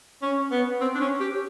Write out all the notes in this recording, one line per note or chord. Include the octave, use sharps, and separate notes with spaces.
C#4
B3
C4
D4
C#4
G4